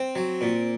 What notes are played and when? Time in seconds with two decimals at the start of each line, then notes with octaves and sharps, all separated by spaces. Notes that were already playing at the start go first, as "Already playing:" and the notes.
Already playing: C4
0.15 F#3
0.41 A#2